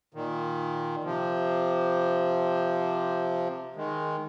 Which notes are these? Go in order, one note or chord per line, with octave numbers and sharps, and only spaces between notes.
A#2 D#3
C3 F3
D#3 G#3